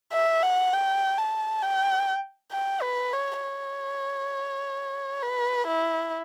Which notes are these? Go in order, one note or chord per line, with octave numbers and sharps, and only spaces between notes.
E5
F#5
G5
A5
G5
G5
B4
C#5
C#5
B4
E4